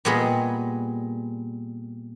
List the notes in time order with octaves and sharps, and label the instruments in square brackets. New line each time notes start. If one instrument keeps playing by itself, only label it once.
[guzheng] A#2 G3 B3 G#4 B4 D#5